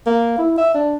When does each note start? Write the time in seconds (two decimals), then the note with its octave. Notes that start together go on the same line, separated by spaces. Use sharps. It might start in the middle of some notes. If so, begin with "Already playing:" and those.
0.06 A#3
0.39 E4
0.58 E5
0.75 D4